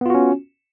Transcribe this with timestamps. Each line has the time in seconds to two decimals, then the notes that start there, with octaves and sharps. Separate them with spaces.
0.01 B3
0.06 F4
0.10 F#4
0.15 C#4